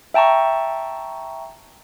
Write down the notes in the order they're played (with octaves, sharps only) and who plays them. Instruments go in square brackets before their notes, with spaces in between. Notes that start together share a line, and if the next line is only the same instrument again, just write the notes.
[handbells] E5 G5 A5 A#5 C#6